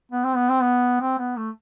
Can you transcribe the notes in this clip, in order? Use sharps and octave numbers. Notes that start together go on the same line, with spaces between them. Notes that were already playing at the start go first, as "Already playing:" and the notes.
B3
C4
B3
C4
B3
C4
B3
A3